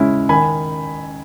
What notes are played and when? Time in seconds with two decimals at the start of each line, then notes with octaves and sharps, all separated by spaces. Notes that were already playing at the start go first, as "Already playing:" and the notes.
Already playing: C#3 G#3 C#4 E4
0.29 D#3 G#5 B5